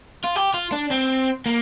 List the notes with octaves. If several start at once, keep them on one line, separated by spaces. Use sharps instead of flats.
F4
G4
F4
D4
C4
A#3